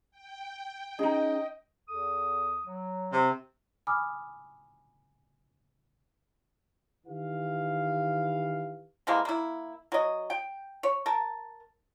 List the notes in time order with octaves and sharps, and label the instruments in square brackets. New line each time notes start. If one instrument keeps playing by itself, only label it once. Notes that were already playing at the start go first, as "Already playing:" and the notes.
[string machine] G5
[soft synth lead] C#4 [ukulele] D#4 G#4 [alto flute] D#5
[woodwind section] E2 A4 D#6
F#3
[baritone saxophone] C3
[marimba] G#5 B5 D6 D#6 F6
[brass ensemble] D#3 E3 G4 F5
[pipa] C3 E3 G#3 A#3
A#3 E4
F#3 D#5
G5
C#5
A#4 A5